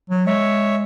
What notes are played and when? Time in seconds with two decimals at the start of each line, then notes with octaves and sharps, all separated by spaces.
0.10 F#3
0.26 G#3 C#5 E5